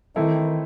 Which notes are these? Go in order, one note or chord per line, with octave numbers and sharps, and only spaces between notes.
D#3 E3 A3 C4 E4 A4